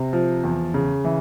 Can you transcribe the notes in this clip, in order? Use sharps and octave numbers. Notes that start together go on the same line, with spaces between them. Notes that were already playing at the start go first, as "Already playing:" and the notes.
Already playing: C3
F3
E2
C#3
E3